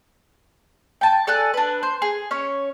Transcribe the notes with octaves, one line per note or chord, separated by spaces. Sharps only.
G5 A5
A4 D5 G#5 F#6
D4 B4
C5
G#4
C#4 C#5